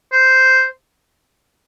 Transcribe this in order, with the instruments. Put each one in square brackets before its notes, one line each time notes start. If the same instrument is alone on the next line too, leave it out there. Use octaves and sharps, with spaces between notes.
[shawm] C5